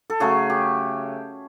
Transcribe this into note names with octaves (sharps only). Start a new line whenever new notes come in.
A4
C#3 F#3 A3 G#4
G4